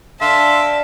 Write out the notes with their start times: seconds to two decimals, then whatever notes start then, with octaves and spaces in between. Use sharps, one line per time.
0.21 D3 E5 F5 A5 C6